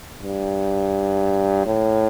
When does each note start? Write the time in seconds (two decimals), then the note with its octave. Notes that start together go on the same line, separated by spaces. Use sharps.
0.23 G2
1.66 A2